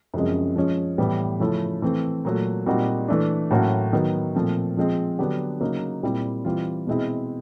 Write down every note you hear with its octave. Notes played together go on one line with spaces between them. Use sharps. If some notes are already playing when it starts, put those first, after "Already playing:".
F#2 C#3 F3 G#3 C4
F3 G#3 C#4
A2 E3 G3 B3
C#3 F3 A3 C#4 E4
E3 A3 C4
A#2 F#3 A3
A#2 G3 C4 D#4 F#4
E3 A3 D4
A2 F#3 A#3 C#4 F#4
D#3 F#3 B3
A#2 F3 A3 C4
F3 G#3 C4
D3 F#3 B3 D4 G4
C#3 F#3 A#3 D#4
A#2 G3 C4 E4
E3 G3 C4 F4
B2 G#3 C4 E4